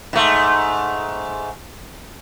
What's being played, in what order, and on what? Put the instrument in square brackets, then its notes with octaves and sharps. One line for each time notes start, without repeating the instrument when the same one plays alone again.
[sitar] G#2 A3